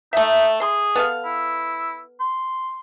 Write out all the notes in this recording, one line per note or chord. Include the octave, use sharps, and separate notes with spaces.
A3 D#4 E5
G#4 C6
B3 A4 F5
E4
C6